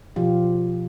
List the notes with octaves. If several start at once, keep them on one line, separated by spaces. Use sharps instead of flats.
B2 F3 F4 G4